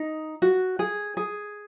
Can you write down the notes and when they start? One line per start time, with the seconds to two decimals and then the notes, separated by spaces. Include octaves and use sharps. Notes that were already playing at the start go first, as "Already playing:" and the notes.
Already playing: D#4
0.42 F#4
0.79 G#4
1.17 G#4